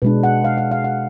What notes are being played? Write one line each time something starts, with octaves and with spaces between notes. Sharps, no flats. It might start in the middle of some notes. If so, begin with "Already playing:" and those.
B2 G#3 D4 B4
F#5
F5
F#5
F5
F#5